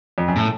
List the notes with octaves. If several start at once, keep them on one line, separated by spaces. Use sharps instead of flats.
F2
F#2
A2